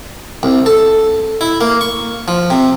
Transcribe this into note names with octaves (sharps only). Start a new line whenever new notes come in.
C2
A4
E4
A#3
C#6
F3
C3